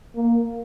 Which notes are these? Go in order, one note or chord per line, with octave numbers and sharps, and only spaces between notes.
A#3